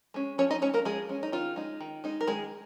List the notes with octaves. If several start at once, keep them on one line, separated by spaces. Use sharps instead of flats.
G#3 C#4
F3 C#4 C#5
D#4 D#5
G#3 C#4 C#5
A#3 A#4
F3 G#3 G#4
G#3 C#4
D#4
D#3 F4
G#3 D#4
D#3
G#3 D#4
A#4
D#3 G#3 G#4